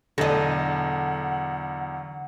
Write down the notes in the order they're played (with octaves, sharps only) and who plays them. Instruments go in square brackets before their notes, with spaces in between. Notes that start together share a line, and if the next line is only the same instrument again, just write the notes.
[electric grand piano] B1 E2 A#6 [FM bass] D3 [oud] A4 D#5 [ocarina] F#5